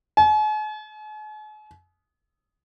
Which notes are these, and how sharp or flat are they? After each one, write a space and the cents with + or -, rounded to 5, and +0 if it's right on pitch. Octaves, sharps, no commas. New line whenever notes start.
G#5 +45